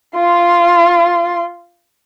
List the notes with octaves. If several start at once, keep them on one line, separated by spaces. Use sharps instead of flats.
F4 C6